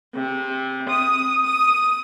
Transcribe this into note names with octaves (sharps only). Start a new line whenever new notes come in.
C3
D#6
D#6